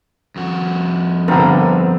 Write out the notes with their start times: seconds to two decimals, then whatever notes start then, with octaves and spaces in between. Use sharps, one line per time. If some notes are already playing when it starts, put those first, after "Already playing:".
0.36 F2 F#4
1.28 G2 D3 B3 C4 A#4